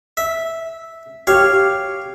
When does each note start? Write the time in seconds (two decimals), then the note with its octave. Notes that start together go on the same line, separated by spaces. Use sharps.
0.17 E5
1.27 G4 C#5 F5